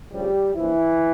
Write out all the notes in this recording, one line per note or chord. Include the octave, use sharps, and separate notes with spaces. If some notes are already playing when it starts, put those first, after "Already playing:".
D2 C#3 F3 G3 G4
A#1 A#2 E3 F3 E4